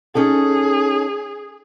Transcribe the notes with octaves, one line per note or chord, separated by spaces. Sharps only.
C#4 D#4 G#4 A4